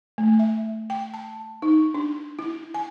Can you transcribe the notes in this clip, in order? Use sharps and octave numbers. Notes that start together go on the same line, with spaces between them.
A3
E5
G5
A5
D#4
D4
E4
G#5